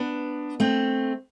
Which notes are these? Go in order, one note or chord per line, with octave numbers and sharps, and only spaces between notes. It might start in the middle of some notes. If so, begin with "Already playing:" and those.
Already playing: B3 D4
A3 C4